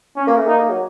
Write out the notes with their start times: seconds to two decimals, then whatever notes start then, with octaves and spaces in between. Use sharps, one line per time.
0.16 C#4
0.27 A#3
0.37 A3
0.46 A#3 D#4
0.69 F#3